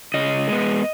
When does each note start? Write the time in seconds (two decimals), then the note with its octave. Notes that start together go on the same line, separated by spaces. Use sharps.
0.14 C#3 D#5
0.48 G#3 B3